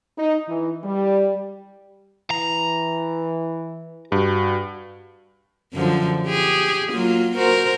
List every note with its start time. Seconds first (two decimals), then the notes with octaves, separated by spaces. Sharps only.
0.18 D#4
0.48 E3
0.84 G3
2.31 E3 A#5
4.12 G2 F#4
5.73 F#2 D3 F3
6.26 G4 G#4
6.92 F#3 A#3 F4
7.37 F#4 A#4 C5